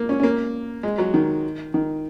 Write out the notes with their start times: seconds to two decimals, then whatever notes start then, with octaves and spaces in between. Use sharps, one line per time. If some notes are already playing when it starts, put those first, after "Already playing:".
Already playing: A#3
0.09 C#4
0.20 C#4
0.23 A#3
0.83 G#3
0.98 F#3
1.14 D#3
1.74 D#3